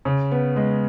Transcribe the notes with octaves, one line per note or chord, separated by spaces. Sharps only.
C#3
B3
G#3